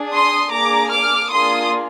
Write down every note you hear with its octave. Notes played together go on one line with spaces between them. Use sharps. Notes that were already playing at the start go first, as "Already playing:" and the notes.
Already playing: D4 G#4
C6 D#6
A#3 D4 G#4 A#5 D6
D6 F6
A#3 D4 F4 G#4 C6 D#6